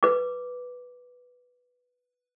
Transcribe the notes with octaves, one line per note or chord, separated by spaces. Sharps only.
B4 D6